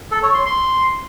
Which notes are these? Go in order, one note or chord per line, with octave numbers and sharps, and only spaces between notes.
A4
C#5
C6
C6